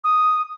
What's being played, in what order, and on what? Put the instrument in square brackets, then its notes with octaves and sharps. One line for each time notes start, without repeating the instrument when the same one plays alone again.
[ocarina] D#6